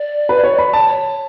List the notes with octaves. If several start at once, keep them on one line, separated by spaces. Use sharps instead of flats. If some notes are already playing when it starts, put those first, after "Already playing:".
Already playing: D5
B4
C#5
B5
A5
C#5